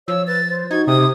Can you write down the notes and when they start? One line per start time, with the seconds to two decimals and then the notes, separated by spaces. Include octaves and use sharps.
0.08 F3 C#5 E6
0.27 B4 A6
0.49 C5
0.71 D#4 F#4 G#6
0.87 C3 G4 D#6